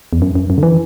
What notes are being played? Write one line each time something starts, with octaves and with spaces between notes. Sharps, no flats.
E2
F#2
F#2
F#2
D3
E3